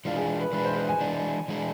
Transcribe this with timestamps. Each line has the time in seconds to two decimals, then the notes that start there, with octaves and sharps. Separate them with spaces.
0.05 E3 G#3 D4 F4
0.16 G#4
0.40 B4
0.53 E3 G#3 D4 B4
0.64 C5
0.77 B4
0.89 G#5
1.01 E3 G#3 D4
1.48 E3 G#3 D4